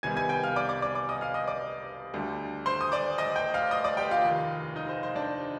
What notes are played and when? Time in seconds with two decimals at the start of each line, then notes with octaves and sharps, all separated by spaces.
0.03 C2 C3 D#3 G3 B3 G#5 G#6
0.17 G#5 G#6
0.29 G5 G6
0.44 F5 F6
0.56 D5 D6
0.69 D5 D6
0.82 D5 D6
0.95 D5 D6
1.09 D#5 D#6
1.21 F5 F6
1.34 D#5 D#6
1.47 D5 D6
2.14 D2 D3 G3
2.66 C5 C6
2.81 D#6
2.92 D5 D6
3.18 D#5 D#6
3.36 G5 G6
3.54 F5 F6
3.71 D#5 D#6
3.84 D5 D6
3.97 G4 G5
4.11 F4 F5
4.24 F1 D#2 D#3
4.76 D#4 D#5
4.89 C5
5.03 C5
5.15 D4 D5